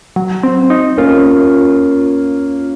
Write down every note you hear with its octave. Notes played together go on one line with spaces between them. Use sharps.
F#3
C4
D#4
A#3 C#4 F4